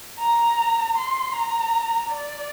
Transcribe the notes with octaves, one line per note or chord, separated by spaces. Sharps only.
A#5
C6
A#5
D5